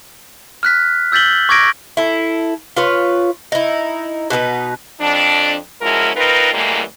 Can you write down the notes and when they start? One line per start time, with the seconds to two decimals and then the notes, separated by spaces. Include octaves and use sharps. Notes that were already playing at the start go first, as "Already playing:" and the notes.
0.63 F6 F#6 B6
1.12 E6 G6 A6 B6 F#7 G7
1.49 C#6 D6 G#6 A#6 D7
1.97 E4 A4
2.77 F4 B4 C#5
3.52 D#4 E4
4.30 B2 D#4 F#4 B4
5.00 F2 D4
5.81 F3 G#3 C#4 E4 F#4 A#4
6.15 C4 D#4 F4 A#4 B4
6.53 F#2 A2 E3 G3 G#3 A#3